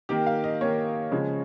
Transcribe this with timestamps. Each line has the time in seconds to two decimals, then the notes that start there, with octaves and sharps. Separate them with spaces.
0.09 D#3 A#3 G4
0.26 F5
0.44 D#5
0.61 D#3 A#3 C#5
1.11 C#3 F3 G#3